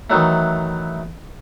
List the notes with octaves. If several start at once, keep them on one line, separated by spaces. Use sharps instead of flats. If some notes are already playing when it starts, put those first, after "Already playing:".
D#3 E3 F#3 A3